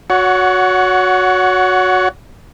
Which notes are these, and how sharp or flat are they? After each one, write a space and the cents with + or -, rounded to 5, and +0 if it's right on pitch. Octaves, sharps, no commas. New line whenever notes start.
F#4 -15 C#5 +25 F#5 +0